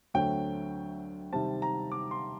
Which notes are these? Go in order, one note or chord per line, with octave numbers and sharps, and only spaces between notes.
D2 D3 F#3 A3 C4 G5
C3 D#3 G3 C4 A5
A#5
D6
C6